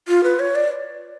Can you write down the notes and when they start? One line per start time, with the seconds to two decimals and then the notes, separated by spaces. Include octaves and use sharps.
0.08 F4
0.24 B4
0.39 C#5
0.55 D5